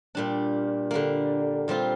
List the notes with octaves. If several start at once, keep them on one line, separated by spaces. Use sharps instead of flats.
A#2 G3 D4
D3 G3 A#3
A#2 G3 C4 F4